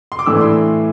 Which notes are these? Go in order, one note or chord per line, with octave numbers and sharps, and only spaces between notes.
C6
D6
A2 E3 A3 D4 E6
C6